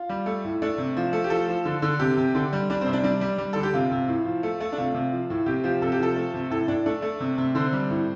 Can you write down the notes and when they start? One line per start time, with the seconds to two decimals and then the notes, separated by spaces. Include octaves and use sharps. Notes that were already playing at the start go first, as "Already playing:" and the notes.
Already playing: F4
0.09 G3
0.26 A3
0.45 A2
0.62 A3 D4
0.78 C3
0.97 F3
1.13 A3
1.24 G4
1.30 F3 A4
1.49 F3
1.65 D3
1.82 D3
1.99 C3 G4
2.17 C3
2.35 D3
2.53 G3
2.70 G3 D4
2.81 C4
2.87 C3
2.93 D4
3.04 G3 D4
3.21 G3
3.38 G3
3.53 D3 A4
3.63 G4
3.74 C3 F4
3.91 C3
4.08 A2
4.25 F3
4.43 A3
4.60 A3
4.73 D4
4.78 C3 F4
4.94 C3
5.12 F3
5.30 A2
5.46 C3 G4
5.64 F3 G4
5.82 C3 A4
5.92 G4
5.99 F3 A4
6.16 A3
6.34 C3
6.50 A2 A4
6.68 A2 D4
6.86 A3 D4
7.02 A3
7.20 C3
7.38 C3
7.55 D3 C4
7.73 G3
7.90 A2